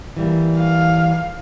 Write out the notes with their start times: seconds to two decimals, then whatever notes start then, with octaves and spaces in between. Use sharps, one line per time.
0.17 E3 G3 A#3
0.59 F5